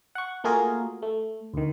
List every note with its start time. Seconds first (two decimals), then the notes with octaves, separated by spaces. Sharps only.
0.15 F#5 C#6
0.44 A3 A#3 F4 F#4 G#4 A#4
1.02 A3
1.54 D2 D#3